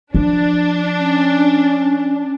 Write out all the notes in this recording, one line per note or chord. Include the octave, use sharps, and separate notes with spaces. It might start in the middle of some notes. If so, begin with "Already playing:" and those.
F3 D4
C#4